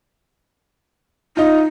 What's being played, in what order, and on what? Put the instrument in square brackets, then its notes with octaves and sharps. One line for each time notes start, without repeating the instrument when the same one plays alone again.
[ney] D#4 [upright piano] F4 D#5